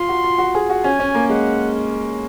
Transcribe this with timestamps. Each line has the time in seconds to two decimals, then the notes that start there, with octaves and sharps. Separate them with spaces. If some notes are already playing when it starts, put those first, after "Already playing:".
Already playing: F4 C6
0.09 F#4
0.24 F4
0.38 F#4
0.55 G#4
0.70 F#4
0.84 C#4 G#5
1.00 C#4
1.15 A#3
1.30 G#3 F#5